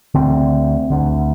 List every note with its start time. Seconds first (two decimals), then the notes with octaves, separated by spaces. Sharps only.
0.14 D2 D3 C4
0.90 D2 D3